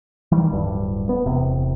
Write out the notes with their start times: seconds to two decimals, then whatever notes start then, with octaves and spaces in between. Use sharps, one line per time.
0.32 D#3 E3 G3
0.51 D1 G2
1.09 B3
1.26 E1 C3